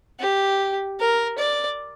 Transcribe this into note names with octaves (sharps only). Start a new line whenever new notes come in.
G4
A#4
D5